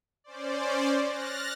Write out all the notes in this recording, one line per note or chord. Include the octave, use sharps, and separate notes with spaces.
C#4 C5 D5
F6 F#6 A6 A#6